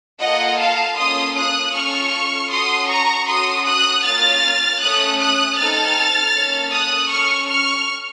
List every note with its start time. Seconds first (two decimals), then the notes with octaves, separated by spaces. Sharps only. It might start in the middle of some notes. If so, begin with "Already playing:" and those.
0.21 A#3 F4 A4 D#5 F#5
0.59 F5 A5
0.98 A#3 C#4 F4 A4 C6 D#6
1.36 D#6 F#6
1.74 C#4 F4 A4 C#6 F6
2.51 C#4 F#4 A4 C6 D#6
2.89 A#5 C#6
3.27 C#4 F#4 A4 C6 D#6
3.66 D#6 F#6
4.04 A#3 C#4 F4 F6 A6
4.81 A3 C#4 A4 D#6 F#6
5.20 D#6 F#6
5.58 C4 D#4 A4 F6 A6
6.35 A#3 C#4 A4
6.73 D#6 F#6
7.11 C#4 A4 C#6 F6
7.50 C#6 F6